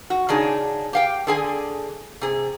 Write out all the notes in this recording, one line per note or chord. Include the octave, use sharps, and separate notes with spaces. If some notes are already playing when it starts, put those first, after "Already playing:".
F#4
C#3 D4 D#4 G#4
G4 F5 G5
D3 G#4 G#5
C3 G#4